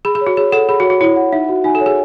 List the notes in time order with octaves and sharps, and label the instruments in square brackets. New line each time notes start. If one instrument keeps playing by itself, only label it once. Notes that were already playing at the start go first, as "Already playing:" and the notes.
[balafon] G#4 [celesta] B5
[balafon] G#4
[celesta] C#5
[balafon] F#4
[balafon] G#4 [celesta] C#5
[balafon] A4 [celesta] F#5
[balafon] G#4 [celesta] B5
[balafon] F#4
[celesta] C#5
[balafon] F#4
[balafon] E4 [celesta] C#5
[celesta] F#5
[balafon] D#4 [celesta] E5
[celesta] F#4
[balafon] D#4 [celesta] G#5
[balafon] A4
[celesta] C#5
[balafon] G#4